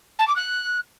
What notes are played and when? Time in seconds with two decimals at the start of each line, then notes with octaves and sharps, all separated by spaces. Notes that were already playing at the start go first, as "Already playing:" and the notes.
0.19 A5
0.27 D6
0.36 F#6